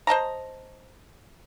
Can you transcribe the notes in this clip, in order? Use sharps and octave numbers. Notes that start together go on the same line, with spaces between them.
C5 D#5 A5 A#5